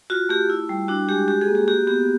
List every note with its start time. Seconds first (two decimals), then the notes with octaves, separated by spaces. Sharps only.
0.10 F4 F#4
0.29 A3 G4
0.50 E4
0.69 G3
0.88 D4 F#4
1.09 G#3 G4
1.28 F#4 G4
1.41 G#4
1.48 A#3
1.55 G4
1.68 F#4 G4
1.87 B3 G4